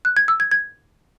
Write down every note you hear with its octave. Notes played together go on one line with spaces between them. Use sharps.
F#6
G#6
E6
G#6
G#6